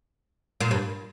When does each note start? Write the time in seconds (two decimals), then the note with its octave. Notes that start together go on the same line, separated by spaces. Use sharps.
0.61 A#2
0.71 G2